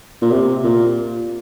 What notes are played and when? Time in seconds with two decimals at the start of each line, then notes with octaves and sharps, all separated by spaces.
0.22 A#2
0.31 C3
0.64 A#2